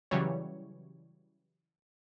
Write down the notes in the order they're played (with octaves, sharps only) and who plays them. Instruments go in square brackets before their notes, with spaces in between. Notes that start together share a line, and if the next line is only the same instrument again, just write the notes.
[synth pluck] C#3 E3 F#3 G3 C#5